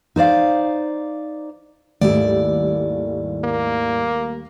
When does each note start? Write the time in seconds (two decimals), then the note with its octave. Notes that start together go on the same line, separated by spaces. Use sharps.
0.16 D#4 C5 D5 F5
2.01 D#2 G#2 G3 A3 E4 D5
3.44 A#3